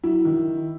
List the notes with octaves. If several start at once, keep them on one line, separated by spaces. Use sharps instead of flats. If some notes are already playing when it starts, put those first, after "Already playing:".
F#3 E4
D#3